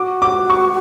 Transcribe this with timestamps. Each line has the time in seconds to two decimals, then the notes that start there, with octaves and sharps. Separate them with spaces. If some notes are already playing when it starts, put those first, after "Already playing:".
Already playing: F#4 D6
0.22 D6
0.50 C#6